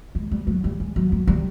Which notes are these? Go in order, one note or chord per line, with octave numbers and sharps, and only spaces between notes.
G#3
G3
F#3
G3
G#3
F#3
F#3
G3